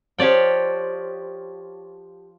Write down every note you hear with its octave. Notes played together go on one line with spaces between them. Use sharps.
F3 G4 C#5 D5 G5